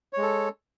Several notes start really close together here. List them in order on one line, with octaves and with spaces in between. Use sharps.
C#5 G#3 A4